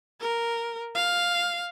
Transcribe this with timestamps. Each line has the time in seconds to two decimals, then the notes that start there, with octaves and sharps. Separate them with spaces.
0.21 A#4
0.95 F5